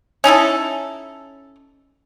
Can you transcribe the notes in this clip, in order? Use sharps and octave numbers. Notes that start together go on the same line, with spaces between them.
C#4 D#4 E4 A4